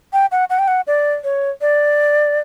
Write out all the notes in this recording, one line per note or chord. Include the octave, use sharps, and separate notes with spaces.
G5
F#5
F#5
G5
F#5
D5
C#5
D5